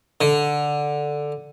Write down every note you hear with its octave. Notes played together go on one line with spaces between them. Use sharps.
D3